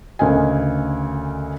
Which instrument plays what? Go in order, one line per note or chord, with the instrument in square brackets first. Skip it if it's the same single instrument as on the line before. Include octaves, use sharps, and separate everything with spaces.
[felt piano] D2 C#3 A#4 D#5 G#5